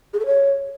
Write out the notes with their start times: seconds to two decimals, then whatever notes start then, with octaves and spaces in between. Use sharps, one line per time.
0.13 G#4
0.20 A4
0.26 C#5